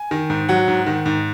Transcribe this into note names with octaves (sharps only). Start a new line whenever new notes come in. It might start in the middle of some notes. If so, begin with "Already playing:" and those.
Already playing: G#5
D#3
G#2
F#3 F#5
G#2
D#3
G#2